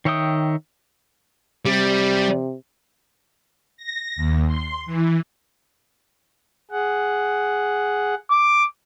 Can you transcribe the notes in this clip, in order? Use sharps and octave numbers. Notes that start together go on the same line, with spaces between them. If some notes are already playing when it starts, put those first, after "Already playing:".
D#3 C#5 E5 G5 D#6
C3 G3
A#6
D#2
C6
E3
G#4 F#5
D6